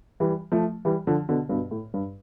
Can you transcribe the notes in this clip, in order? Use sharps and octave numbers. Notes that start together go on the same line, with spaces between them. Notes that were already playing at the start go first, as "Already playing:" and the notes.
E3 G3
F3 A3
E3 G3
D3 F3
B2 D3
G2 B2
A2
G2